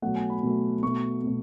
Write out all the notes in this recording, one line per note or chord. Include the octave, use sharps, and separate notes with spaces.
B2 F#3 A3 F#5
G#5
B5
B2 F#3 A3
B2 A3 C#6
B2 A3